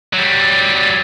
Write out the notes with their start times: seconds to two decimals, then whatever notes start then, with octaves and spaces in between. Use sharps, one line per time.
0.13 F#3 G3